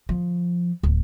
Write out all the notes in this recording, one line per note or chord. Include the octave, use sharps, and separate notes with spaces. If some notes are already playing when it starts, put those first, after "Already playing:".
F3
D1